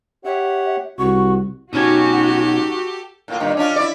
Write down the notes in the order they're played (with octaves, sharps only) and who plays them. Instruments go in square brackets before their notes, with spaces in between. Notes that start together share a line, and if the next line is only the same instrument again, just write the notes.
[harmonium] G4 C#5 F#5 [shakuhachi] E5
[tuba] C2 [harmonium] F#4 [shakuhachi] C#6
[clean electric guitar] B1 C#4 G#5 [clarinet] D#4 [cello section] F#4 [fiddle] G4 A4
[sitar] A2 A#3 F4
G2 A#2 D#3
C#4 D4 F4
E4 D5